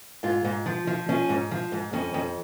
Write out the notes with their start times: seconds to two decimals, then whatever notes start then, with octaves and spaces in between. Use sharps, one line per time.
0.23 G#2 F4
0.45 G#2
0.66 F3
0.87 F3
1.09 F3 C#4
1.29 G#2
1.51 F3
1.72 G#2
1.93 F2 C#4
2.14 F2